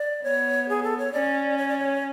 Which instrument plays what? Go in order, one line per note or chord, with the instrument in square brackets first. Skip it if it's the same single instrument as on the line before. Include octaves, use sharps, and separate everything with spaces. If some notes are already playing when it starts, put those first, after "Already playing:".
Already playing: [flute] D5
[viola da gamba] B3 [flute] C#5
[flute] G#4
A4
C#5
[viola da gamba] C#4 [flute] D5
[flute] C#5
D5
C#5